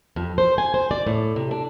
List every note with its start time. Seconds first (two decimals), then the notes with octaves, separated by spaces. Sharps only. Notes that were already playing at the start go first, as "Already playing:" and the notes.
0.16 F2
0.38 C5
0.58 G#5
0.74 C5
0.91 D5
1.07 A2
1.36 C3
1.51 D4